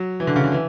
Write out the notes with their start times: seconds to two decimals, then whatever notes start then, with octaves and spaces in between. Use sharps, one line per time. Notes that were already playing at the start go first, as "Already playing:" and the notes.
Already playing: F#3
0.20 E3
0.27 D3
0.36 C#3
0.44 D3
0.52 E3